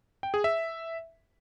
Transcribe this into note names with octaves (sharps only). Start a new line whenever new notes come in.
G5
G#4
E5